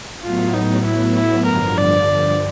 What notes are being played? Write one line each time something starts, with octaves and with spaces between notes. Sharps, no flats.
A2 F#3 B3 F4
D#4
E4
E4
G2 D3 F3 A#4
D5